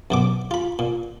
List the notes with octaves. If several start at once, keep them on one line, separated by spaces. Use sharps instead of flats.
F#2 B2 D6
F4 B5
A#2